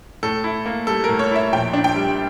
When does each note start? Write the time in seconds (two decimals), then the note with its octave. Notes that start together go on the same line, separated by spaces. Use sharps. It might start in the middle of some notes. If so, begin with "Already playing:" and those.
0.23 A2 A4
0.44 E4
0.66 A#3
0.87 G3 A4
1.04 A2 A#4
1.19 C#5
1.31 E4 E5
1.52 A#1 G5
1.73 D4
1.84 G5
1.96 G3